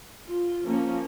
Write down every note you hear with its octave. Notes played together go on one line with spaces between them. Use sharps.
F4
F3 A#3 C#4